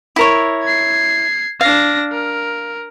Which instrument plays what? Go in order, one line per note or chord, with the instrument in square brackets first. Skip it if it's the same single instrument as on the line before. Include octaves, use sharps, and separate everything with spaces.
[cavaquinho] E4 A#4 C#5
[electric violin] G#6 C7
[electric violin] D4 A#6 [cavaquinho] F5
[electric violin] A#4